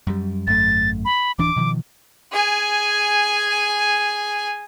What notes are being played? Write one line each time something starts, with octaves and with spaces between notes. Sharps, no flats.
F#2 G3
G#1 F#2 A3 A6
B5
D1 E3 D4 D6
B2 D#3 F3
G#4 G#5